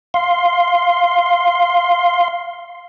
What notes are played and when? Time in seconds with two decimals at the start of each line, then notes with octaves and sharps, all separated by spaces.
0.14 F5 C6